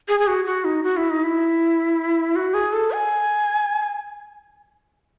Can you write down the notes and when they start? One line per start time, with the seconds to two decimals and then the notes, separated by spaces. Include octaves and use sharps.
0.08 G#4
0.20 G#4
0.27 F#4
0.45 F#4
0.65 D#4
0.84 F#4
0.97 E4
1.10 D#4
1.24 E4
2.36 F#4
2.54 G#4
2.73 A4
2.92 G#5